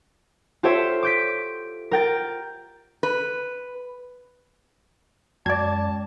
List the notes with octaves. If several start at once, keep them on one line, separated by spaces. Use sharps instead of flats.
F4 G4 A4 C5 C#5 E5
D6 G6 B6
A#4 G5 A6
B4
F#2 G#3 D5 A5 G#6